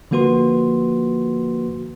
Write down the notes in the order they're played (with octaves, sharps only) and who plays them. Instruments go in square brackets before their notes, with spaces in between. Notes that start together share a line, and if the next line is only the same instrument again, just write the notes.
[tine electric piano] D3 F3 A#3 F#4 B4 C6